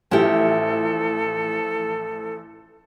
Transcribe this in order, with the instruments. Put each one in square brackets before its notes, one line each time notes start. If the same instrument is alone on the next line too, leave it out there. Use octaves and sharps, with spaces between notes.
[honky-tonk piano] A1 F3 F6 [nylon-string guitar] E4 G4 [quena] A4